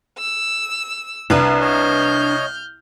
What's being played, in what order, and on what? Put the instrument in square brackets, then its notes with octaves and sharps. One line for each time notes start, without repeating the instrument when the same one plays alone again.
[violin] E6
[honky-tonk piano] C2 [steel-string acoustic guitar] D4 B4 A#5
[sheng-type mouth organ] C#5 D#5 [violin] F6 G6